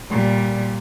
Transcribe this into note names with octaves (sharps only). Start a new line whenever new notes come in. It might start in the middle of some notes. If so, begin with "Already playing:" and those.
A#2 G3